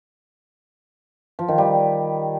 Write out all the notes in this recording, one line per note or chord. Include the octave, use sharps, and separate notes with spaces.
F3
D#3
G3